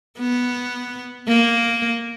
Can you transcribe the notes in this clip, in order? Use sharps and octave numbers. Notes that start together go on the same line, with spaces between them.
B3
A#3